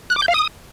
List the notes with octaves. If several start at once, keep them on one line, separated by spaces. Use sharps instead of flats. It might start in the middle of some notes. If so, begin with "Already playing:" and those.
F#6
D6
G6
F5
D#6